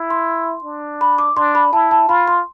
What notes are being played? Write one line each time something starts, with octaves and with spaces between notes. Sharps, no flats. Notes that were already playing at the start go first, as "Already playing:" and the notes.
Already playing: E4
C6
D4
B5
D6
D4 C6
B5
E4 A5
A5
F4 B5
C6